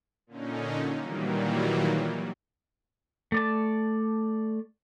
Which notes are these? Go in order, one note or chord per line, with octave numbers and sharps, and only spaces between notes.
A#2 D3 C#4 D#4
A#2 D#3 E3 F#3 G3 A#3
A3 D5 A5